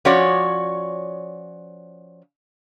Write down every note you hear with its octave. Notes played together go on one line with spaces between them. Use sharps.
F3 C#4 F#4 C#5 D5